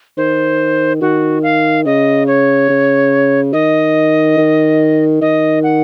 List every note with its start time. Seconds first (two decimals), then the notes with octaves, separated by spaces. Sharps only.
0.17 D#3 C5
1.01 D#3 F#4
1.43 F5
1.86 C#3 D#5
2.27 C#5
2.69 C#3
3.53 D#3 D#5
4.38 D#3
5.21 D#3 D#5
5.63 F#5